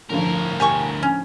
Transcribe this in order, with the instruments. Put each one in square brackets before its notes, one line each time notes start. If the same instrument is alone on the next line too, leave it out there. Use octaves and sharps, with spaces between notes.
[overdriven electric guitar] D2 A#4 [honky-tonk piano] A2 D3 F3
[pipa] G4 G#5 C#6
C#4